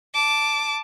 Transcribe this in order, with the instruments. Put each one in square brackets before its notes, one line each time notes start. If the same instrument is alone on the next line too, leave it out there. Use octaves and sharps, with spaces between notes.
[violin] A5 D6